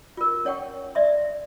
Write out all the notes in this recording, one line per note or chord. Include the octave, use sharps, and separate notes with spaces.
F4 A#4
C#4 C#5 F#5 G5 C#6
D5 E5 C6